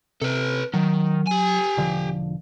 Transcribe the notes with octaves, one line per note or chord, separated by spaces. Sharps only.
C3 A4 B4
D#3 F#3
G4 G#5
E1 D3 F3